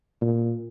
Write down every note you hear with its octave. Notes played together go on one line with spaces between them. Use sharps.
A#2